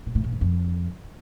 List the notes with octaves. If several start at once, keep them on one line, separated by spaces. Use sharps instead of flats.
A#2
A2
A#2
E2
F2